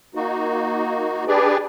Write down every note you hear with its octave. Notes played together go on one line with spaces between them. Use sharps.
A#3 D#4 F#4
D4 G4 G#4 B4 D5